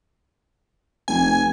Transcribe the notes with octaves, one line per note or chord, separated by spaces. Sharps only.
F1 G#5